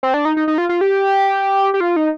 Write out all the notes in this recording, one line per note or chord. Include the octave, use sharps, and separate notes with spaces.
C4
D4
D#4
D#4
D#4
F4
F4
G4
G4
F4
D#4